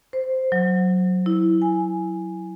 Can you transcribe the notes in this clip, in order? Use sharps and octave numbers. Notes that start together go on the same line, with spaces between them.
C5
F#3
E4
G#5